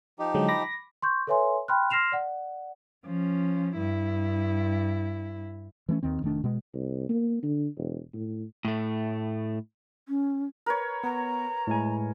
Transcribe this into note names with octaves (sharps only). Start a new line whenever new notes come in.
F3 D#4 G4
D3 F#3 G#3
B5 D6 A#6
C6 C#6 G6
A4 B4 C#5 E5 G#5 C6
G5 B5 C6 F6 F#6
C6 F6 A#6 C7 E7 F7
D5 F#5
F3 C#4
G2 E4
E3 A3 C4 C#4
D#2 D#3 C4
F1 D#3 A3 D4
B2 G#3
C2
A#3
D3
E1
A2
A2 A3
C#4
A#4 B4 C#5
B3 A#5
A2 G#3 G#5